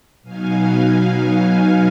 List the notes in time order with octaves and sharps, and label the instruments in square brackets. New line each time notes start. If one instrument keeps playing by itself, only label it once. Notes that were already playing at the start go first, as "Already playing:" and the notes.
[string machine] B2 F#3 B3 D#4 F5 G#5